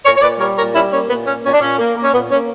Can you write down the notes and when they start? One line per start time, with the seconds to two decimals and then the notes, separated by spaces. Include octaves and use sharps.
0.05 A#2 A#4 C#5
0.16 C#5
0.22 A#2 B4 D5
0.40 G3 A#4 C#5
0.56 A#2 A#4 C#5
0.74 G3 C#4 E4
0.92 A#3 C#4
1.09 A#2 B3
1.26 A#3 C#4
1.44 A#2 C#4
1.53 D4
1.61 A#2 C#4
1.78 A#3
1.96 A#3
2.02 C#4
2.13 A#2 B3
2.31 A#3 C#4